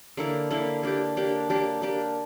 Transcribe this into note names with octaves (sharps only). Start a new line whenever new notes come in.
D3 A#3 E4
D3 A#3 E4
A#3 D4 G4
A#3 D4 G4
A#3 D4 G4
A#3 D4 G4